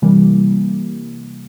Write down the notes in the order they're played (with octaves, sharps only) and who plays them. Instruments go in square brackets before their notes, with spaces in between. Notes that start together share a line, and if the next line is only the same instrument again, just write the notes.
[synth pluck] C3 E3 G3 A#3